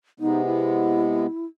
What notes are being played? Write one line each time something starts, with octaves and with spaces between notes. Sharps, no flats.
C3 G#3 B3 D#4
E4